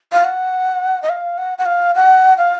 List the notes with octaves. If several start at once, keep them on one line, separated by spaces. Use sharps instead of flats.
F5
F#5
D#5
F5
F#5
F#5
F5
F#5
F5